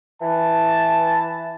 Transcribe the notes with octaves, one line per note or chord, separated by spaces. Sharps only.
E3 A5